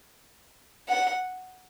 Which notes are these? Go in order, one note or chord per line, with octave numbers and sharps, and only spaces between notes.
F#5